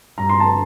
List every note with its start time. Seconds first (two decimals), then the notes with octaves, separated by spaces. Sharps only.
0.18 G2 A#5
0.29 C6
0.40 A5